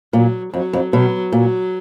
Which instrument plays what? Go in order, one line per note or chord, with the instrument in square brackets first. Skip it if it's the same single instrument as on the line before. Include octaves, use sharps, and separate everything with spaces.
[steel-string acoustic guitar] A#2 [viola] F#3
[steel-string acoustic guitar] F2 [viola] F#3
[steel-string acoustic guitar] F2
[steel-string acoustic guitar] B2 [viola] F#3
[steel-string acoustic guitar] A#2 [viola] F#3